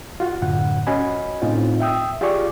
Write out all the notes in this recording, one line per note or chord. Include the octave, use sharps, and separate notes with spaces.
F4 F#4
F#2 A2 D3 F#5
C#4 F#4 D#5 G#5 B5
A2 C4 D#4 F4
E5 G5 D#6 E6
F4 G4 G#4 D5 C#6 D6